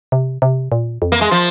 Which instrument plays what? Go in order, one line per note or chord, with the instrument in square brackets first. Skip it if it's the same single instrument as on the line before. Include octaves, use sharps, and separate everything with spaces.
[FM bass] C3
C3
A#2
F2
[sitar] A#3
G#3
F3